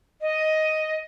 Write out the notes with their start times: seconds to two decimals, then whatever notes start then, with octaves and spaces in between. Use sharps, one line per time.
0.21 D#5